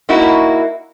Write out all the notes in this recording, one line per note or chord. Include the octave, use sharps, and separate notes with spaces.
A#3 D#4 E4 F#4